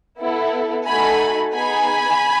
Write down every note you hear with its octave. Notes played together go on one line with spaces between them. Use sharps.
B3 E4 A4
A3 D#4 F#4 A4 G#5 B5
B3 D#4 G#4 G#5 B5